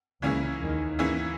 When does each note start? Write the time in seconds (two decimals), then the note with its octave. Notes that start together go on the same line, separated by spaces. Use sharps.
0.22 C#2 C#3 E3 A#3 C#4 E4 G#4
0.60 D#2 D#3
0.99 E3 A#3 C#4 E4 G#4